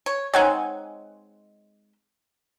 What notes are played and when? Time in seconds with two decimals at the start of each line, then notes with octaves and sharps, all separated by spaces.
0.06 C#5
0.34 G#3 C4 D#4 C#5 F#5 G#5